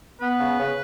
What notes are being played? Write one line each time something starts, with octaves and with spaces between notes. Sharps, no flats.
B3 B4
C#3
C#3